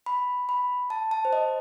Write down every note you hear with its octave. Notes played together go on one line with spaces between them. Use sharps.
B5
B5
A5
A5
C5
D#5